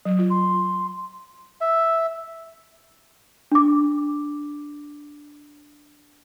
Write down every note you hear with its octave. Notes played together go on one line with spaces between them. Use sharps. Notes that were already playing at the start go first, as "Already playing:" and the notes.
F#3
F4
C6
E5
D4 D6